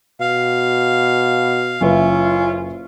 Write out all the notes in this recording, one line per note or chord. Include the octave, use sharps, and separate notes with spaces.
B2 F5
F#1 C#4 E4 F4 B4 E5